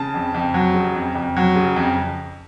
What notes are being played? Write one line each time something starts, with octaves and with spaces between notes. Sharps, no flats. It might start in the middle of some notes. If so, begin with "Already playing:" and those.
Already playing: C#3 A5
F2
F2
F#3
C#3
F2
F2
F#3
C#3
F2